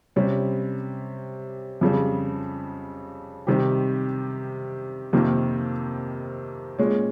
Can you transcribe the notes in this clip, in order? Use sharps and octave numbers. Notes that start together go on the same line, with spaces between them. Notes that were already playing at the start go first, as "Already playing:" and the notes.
C3 G3 C#4
F2 C#3 G3
C3 D#3 G3 C4 G4
F2 C3 D#3 A#3
A#2 G#3 C#4